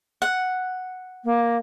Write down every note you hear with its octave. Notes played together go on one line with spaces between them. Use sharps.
F#5
A#3